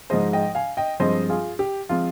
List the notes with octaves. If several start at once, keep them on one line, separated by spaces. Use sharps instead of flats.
G#2 F3 G#3 C5 D#5
D#5 G5
F5 G#5
D#5 G5
G2 F3 G#3 C4 C5 D#5
F4 G#4
G4
F3 G#3 C4 F4